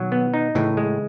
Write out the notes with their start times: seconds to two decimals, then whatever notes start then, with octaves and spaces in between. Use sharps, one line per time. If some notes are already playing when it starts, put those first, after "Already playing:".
Already playing: B2 D#3 F#3
0.12 B3
0.34 D#4
0.55 A2 C#3 E3
0.77 G#3